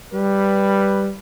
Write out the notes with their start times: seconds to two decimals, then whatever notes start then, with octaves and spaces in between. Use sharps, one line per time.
0.14 G3 B4